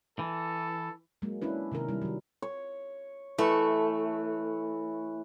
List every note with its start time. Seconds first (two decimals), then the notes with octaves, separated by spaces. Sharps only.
0.19 E3 A4
1.22 F#3 G#3 A#3
1.42 C#4 D4 E4 B4
1.72 C3 D#3 D4 A#4
1.89 G3 E4
2.02 D#3 F#3
2.42 C#5
3.38 E3 A3 C#6